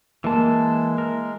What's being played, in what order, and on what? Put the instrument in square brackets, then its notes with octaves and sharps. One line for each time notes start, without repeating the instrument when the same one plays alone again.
[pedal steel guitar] E3 A5 [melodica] G#3 [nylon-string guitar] A#3
[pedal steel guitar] A#4